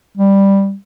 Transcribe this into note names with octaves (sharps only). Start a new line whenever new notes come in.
G3